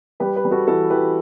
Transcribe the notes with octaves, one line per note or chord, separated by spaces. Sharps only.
G3 G4 B4
G4 B4
G3
F#4 A4
E3 F#4 A4
E3 G4 B4